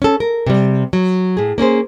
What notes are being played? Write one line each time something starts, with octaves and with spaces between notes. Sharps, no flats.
C#4 A4
A#4
C3 G3
F#3
A2 G#4
A#3 C#4 G#4 C5